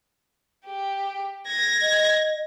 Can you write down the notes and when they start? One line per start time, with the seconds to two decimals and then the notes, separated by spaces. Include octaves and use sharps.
0.66 G4
1.46 G#6 A#6
1.82 D#5